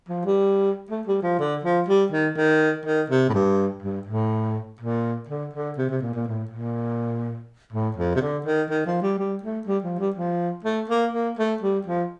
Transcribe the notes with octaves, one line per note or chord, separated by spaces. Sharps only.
F3
G3
A3
G3
F3
D3
F3
G3
D#3
D#3
D#3
C3
A2
G2
G2
A2
A#2
D3
D3
C3
C3
A#2
A#2
A2
A#2
A2
F2
C3
D3
D#3
D#3
F3
G3
G3
A3
G3
F3
G3
F3
A3
A#3
A#3
A3
G3
F3